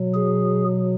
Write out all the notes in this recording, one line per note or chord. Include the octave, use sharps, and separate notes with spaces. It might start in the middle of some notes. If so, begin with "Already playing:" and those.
Already playing: B2 F#3
G#4